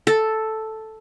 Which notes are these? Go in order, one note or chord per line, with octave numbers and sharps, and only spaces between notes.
A4